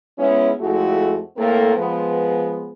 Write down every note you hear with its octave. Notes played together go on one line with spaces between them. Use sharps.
G#3 B3 C#4 D#4 E4
F2 G#3 A3 E4 F#4
A2 A#3 C4 A4 A#4
F3 G#3 B3